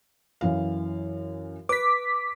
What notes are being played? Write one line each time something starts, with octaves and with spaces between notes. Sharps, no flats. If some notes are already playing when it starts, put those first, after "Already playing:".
F#2 E3 F5
B4 D6 B6